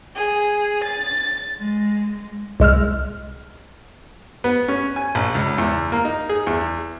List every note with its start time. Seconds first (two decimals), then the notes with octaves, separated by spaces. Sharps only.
0.16 G#4
0.85 A6
1.59 G#3
2.60 C2 G#3 E6 F6
4.44 B3
4.68 C#4
4.96 G#5
5.15 A#1
5.35 C#2
5.58 E2
5.92 A#3
6.05 D#4
6.29 G#4
6.47 E2